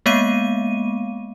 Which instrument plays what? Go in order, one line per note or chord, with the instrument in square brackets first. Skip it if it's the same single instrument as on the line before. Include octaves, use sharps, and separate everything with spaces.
[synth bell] G#3 A#3 B3 F5 D#7